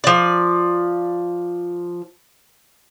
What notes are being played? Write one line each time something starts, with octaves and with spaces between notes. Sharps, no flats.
F3 D5